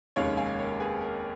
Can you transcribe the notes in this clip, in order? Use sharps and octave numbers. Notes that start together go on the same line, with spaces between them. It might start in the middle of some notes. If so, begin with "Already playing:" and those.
F1 D#2 D#3 G#3 C#4 C#5 F5
F5 G#5
A#4 C#5
G#4 B4
A#4